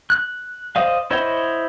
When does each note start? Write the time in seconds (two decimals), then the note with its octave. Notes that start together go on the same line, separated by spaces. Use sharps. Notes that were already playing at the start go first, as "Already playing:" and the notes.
0.10 F#6
0.76 C5 D5 D#5 F5
1.11 E4 C5 C#5 D#5 F#5